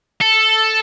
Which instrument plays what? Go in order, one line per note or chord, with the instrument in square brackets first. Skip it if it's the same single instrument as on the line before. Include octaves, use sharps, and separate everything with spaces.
[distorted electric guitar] A4